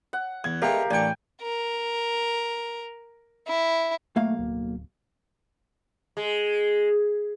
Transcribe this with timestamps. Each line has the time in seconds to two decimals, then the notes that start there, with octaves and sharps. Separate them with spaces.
0.13 F#5
0.44 E2 G#6
0.62 G#3 A3 B3 G4 A#4 C#5 F5
0.91 A1 D4 G5 G#5 C#6
1.42 A#4
3.47 E4
4.16 B1 A3 A#3 F5
4.39 D1
6.17 G#3